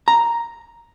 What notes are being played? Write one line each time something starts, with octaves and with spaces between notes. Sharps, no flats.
A#5